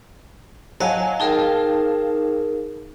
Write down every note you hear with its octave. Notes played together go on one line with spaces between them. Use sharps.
F#3 D#5 F5 F#5 G#5 A5
D#4 G#4 A#4 F5 G5 A5